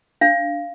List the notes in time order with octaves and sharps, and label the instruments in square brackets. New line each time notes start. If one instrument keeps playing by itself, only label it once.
[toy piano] D4 F5